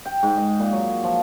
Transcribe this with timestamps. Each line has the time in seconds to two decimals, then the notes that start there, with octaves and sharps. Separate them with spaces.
0.06 G5
0.23 G#2
0.38 D#5
0.60 A#2
0.72 F#3
1.04 F3